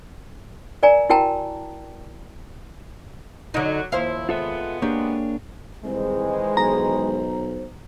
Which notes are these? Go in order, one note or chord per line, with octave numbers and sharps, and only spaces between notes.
A#4 D5 G#5 A#5
E4 F#4 A#4 G5 A5 A#5
D3 F#3 D#4
D#2 F3 E4 C5 F5
G#3 B3 F4 A4 E5
A#3 D4 G4 G#4 C#5
C2 D#3 E3 G#3 C5
B1 A#5